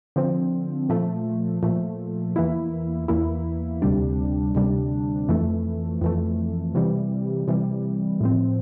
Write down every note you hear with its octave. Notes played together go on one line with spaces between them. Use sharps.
D3 F3 C4
A#2 F3 A3
A#2 F3 A3
E2 E3 A#3 E4
E2 E3 A#3 E4
D2 C3 G3 D4
D2 C3 G3 D4
F2 E3 A3
F2 E3 A3
C3 E3 G3
C3 E3 G3
A2 F3 C4